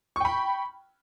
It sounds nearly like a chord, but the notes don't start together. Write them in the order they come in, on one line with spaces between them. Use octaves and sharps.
C#6 G5 B5